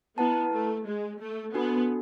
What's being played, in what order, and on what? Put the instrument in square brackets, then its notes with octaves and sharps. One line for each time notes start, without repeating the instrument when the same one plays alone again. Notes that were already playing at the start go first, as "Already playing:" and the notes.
[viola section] B3 [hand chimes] E4 B4 F#5 A5
[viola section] A3
G#3
A3
[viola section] B3 [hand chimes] D4 F#4 A4